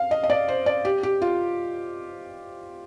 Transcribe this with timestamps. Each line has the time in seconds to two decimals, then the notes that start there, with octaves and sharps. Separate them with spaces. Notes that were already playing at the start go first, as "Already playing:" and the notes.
Already playing: F5
0.11 D#5
0.23 D#5
0.30 D5
0.48 C5
0.66 D5
0.85 G4
1.03 G4
1.22 F4